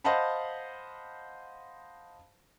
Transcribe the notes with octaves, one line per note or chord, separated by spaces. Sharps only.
C5 D#5 F5 F#5 A5 B5